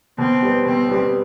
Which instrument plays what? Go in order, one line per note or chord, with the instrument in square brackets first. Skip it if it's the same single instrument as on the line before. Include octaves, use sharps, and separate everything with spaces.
[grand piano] B2 [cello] C4
[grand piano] G3 B3
[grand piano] B2 [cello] C4
[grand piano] G3 B3